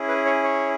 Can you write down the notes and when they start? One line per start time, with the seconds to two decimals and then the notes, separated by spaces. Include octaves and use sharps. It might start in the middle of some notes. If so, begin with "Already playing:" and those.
Already playing: C#4 E4 G#4
0.08 B4
0.25 C#5
0.43 C#5